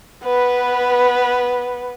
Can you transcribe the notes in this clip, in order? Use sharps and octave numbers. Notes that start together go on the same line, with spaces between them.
B3 B4